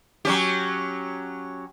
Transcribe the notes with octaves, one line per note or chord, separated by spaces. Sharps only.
F#3 C#4 G4